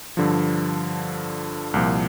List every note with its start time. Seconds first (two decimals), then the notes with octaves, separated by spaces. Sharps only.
0.17 G2 D3 F3
1.74 C2 A#2 F3